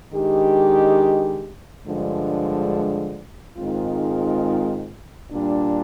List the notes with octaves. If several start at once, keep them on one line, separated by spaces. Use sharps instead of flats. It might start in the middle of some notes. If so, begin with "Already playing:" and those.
D#3 G#3 D4 G4
G2 D3 F3 G#3
G#2 D#3 G#3 C4 F4
A#2 G3 D4